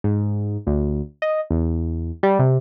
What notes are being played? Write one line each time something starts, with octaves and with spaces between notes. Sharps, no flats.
G#2
D2
D#5
E2
G3
C3